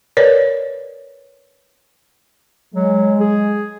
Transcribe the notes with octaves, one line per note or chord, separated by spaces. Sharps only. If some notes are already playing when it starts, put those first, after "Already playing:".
A#4 B4 C#5 D5
F#3 G#3
G#4